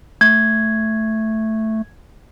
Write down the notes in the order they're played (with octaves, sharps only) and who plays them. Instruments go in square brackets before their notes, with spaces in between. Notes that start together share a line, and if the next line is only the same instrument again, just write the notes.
[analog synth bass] A3 [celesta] G#6